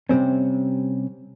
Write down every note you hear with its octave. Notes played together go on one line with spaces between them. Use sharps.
C3 G3 C4 C#4